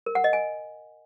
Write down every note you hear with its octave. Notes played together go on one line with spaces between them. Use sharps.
A#4
F#5
D#5
G#5